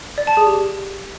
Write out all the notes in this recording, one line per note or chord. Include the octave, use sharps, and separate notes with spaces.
D5
A5
G#4
G4